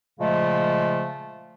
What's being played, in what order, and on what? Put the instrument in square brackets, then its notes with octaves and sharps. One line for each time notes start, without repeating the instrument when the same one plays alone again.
[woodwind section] A#2 C#3 F3 G#3 A3